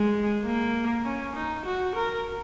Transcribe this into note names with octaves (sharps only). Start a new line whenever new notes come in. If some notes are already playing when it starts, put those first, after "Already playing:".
Already playing: G#3
A#3
C#4
D#4
F#4
A#4